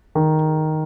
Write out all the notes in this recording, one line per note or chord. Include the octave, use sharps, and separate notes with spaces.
D#3